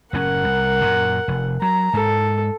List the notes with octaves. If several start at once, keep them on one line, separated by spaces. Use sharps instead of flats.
F#1 A2 C#4 A#4 F#5
C2
F#2 A#2
F1
F#3 A#5
G#2 A4